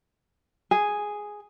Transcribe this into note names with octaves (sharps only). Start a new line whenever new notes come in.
G#4